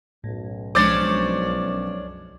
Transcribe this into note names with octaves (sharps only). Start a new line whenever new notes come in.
B1 F#2 A2
C2 F3 G#3 C#4 D4 C5 D6 A6